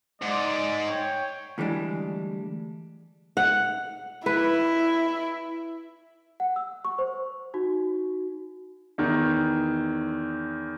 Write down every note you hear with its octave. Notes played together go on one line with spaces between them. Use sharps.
G#2 G#3 D5
C#5 G5
D2 E3 G3 G#3 D4
F#5
E4 B4
F#5
E6
C#6
C5
D#4 F#4
E2 D#3